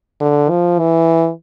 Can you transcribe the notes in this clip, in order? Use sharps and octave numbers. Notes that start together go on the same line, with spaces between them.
D3
F3
E3